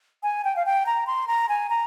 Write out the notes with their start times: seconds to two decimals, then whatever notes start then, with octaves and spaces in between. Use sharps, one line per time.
0.23 G#5
0.45 G5
0.56 F5
0.66 G5
0.86 A#5
1.07 C6
1.27 A#5
1.49 G#5
1.70 A#5